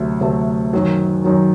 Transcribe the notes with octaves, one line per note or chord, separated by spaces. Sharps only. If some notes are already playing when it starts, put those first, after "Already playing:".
Already playing: D2 C3 F#3 A3
D2 C3 F#3 A3
F#2 D#3 F#3
F#2 D#3 F#3